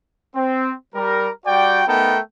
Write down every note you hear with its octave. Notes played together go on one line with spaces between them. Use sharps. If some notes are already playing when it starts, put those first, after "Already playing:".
C4
G3 A#4
G3 F#4 D5 G5
A3 B3 D#4 A4 A#4 G5